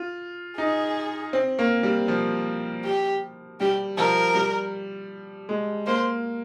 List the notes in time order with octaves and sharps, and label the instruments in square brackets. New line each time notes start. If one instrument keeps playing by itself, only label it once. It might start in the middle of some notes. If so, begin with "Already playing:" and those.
Already playing: [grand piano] F4
[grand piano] D#4 [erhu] G#4
[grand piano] C4
A#3
G3
F3
[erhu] G4
[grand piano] G3 [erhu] G4
[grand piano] F3 [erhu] A#4
[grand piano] G3
G#3
[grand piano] A#3 [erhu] C5